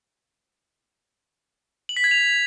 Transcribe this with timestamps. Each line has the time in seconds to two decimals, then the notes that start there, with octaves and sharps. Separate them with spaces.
1.89 F#7
1.97 B6
2.04 G#6
2.11 F7